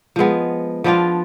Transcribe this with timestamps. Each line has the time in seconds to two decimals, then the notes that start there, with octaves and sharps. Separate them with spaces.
0.16 F3 G#3 B3
0.84 F3 B3 D4 F4